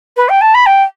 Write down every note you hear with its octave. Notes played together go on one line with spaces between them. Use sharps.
B4
G5
A5
B5
G5